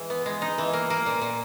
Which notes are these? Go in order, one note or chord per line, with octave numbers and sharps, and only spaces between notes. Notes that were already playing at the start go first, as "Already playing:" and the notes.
Already playing: E3 G#3
B3
G#3
D#4
E3
A#3
A#3
A#2
A#2